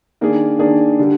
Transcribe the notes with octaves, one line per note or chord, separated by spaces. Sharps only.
D#3 A#3 D4 G#4
D#3 A#3 D4 G#4
D3 G3